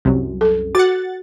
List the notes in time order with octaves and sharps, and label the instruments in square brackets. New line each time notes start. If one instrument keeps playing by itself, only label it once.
[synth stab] C2 F#2
[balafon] A4
[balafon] F#4 [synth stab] F#5 A6